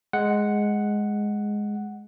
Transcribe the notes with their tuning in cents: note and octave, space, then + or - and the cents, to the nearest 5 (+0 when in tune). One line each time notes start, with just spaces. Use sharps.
G#3 +0 F#5 +0